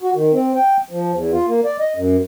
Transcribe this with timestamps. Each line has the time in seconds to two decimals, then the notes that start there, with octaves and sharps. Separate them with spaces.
0.02 F#4
0.15 D#3
0.33 C4
0.55 G5
0.91 F3
1.12 E2
1.33 F4
1.48 A#3
1.64 D5
1.79 D#5
1.96 F#2